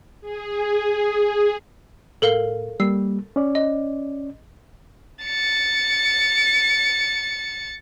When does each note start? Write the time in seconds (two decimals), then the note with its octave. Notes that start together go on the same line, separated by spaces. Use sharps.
0.21 G#4
2.22 A2 A4 A#4 F5
2.80 G3 A#3 E6 C7
3.36 C#4 D5
3.55 D#5
5.25 A6 C#7